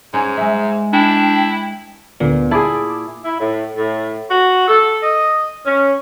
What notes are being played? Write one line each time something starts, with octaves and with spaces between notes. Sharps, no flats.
G#2 C#4
G#3 E5
D4 E4 G5
D2 A#2 D3 B3
E4 G#4 A5 D6
E4
A2
A2
F#4
A4
D#5
C#4